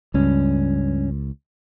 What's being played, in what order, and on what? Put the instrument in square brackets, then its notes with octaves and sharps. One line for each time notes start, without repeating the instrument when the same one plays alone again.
[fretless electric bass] C#2 [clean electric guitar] G2 C#4